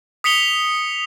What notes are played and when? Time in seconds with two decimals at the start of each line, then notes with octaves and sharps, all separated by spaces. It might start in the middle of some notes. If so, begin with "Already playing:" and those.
0.24 D#6 B6 C#7 F7 G7